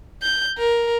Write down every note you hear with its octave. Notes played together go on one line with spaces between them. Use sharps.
G6
A#4